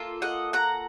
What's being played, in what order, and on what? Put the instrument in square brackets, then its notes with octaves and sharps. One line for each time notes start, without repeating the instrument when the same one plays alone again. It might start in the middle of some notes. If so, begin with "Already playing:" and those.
Already playing: [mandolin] A#3 F4 A4
D#5 F#5
F#5 A#5